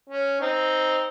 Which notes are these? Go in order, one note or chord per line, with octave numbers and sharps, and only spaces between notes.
C#4
C4 D#4